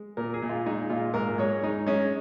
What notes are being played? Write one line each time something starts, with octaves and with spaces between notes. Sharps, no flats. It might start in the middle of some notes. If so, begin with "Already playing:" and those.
Already playing: G#3
A#2 A#4
G#4
A#2
F4
G#3 D#4
A#2 F4
G#2 A#4
G#3 C#5
G#3 D#4
G#3 C#4